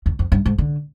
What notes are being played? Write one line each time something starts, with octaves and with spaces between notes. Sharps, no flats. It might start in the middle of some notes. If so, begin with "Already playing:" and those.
E2
F2
G2
G#2
D3